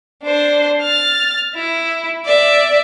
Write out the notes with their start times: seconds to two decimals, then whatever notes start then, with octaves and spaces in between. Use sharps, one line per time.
0.22 D4 C5
0.82 F6 A6
1.55 E4
2.26 D5 E5